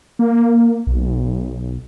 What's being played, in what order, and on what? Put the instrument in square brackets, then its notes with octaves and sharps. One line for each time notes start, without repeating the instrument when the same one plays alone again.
[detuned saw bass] A#3
B1